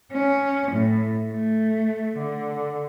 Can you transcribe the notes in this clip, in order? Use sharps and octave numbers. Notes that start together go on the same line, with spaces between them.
C#4
A2
A3
D3